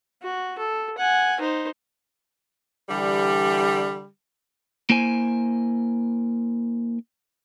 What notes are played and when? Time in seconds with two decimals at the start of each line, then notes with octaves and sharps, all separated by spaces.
0.22 F#4
0.58 A4
0.98 F#5 G#5
1.40 D#4 C5
2.89 D3 E3 G3
4.90 A#3 E4 C5 G#5